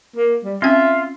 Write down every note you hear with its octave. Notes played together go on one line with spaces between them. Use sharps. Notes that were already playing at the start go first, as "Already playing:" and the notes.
A#3
G3
C4 C#4 F4 E5 G5